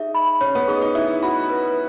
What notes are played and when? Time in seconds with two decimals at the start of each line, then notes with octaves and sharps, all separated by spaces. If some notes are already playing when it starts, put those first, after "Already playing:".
Already playing: D#4 G#4 E5
0.15 B5
0.41 C#4 C#5
0.55 B3
0.68 D#4 G#4
0.81 D#4
0.95 E4 E5
1.22 F#4 B5
1.49 B4